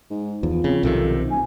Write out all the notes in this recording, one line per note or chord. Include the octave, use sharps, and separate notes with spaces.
G#2
E2 F3
C#3 C4
B1 C3 D#3 A4
D#1 G#5